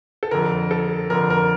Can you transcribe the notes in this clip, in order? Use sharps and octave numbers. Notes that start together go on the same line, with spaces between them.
A4
F2 D3 A#4
A4
F2 D3 A#4
A#4